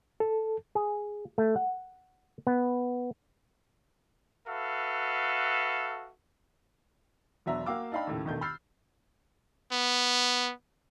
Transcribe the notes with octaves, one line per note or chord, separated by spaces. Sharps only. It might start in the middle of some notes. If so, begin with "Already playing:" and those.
A4
G#4
A3
F#5
B3
F#4 A4 B4 E5 F5
E1 F#3 B3 D4 E5 A#5
A#3 F#4 F5 G5 D6 E6
D4 D#4 F5 G5 B5
D#2 A2 C#3
E1 A#1 B2 D#3 A3 G6
B5 E6 F6 G6 A6 C7
B3